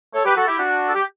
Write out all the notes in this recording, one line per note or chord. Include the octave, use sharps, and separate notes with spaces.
A4 C#5
G4 B4
F#4 A4
E4 G4
D4 F#4
A4
G4